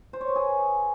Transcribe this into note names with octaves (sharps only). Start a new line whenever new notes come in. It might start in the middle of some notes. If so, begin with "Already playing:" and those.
C5
C#5
B4
G#4